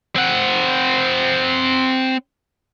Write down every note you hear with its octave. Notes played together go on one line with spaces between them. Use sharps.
C4 F#5